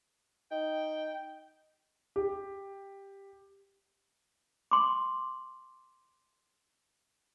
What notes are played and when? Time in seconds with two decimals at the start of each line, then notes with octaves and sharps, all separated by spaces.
0.51 D#4 G5
2.16 G4
4.71 C6 D6